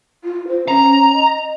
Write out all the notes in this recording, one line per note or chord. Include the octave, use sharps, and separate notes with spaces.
F4
C5
C#4 A#5
D#5